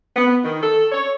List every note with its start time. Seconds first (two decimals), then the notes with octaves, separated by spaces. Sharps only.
0.16 B3
0.44 D#3
0.63 A4
0.92 C#5